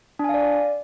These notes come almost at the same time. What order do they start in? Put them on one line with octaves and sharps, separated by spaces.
D4 G#5 F5 D5